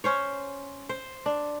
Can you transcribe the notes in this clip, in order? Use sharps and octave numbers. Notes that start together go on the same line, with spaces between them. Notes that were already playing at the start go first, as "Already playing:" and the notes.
C#4 C5 C#5
C5
D4